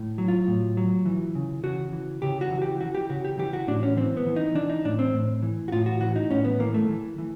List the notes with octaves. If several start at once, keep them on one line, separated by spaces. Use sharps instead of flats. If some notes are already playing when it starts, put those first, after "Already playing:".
Already playing: A2
F#3
F4
A2
F#3
E3
C#3
C#3 F#4
E3
C#3 G4
F#4
E3
G4
E3 F#4
G4
C#3 F#4
G4
E3 G4
F#4
A2 D4
C#4
E3 C4
B3
E3
D#4
E3 D4
D#4
A2 D4
C4
A2
E3
F#4
A2 F4
F#4
E3 F#4
D#4
A2 C#4
B3
E3 A#3
A3
E3
E3